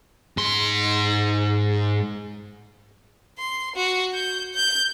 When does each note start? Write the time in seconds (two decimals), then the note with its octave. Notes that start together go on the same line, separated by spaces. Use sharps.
0.37 G#2 C6
3.38 C6
3.76 F#4
4.14 G6
4.54 G6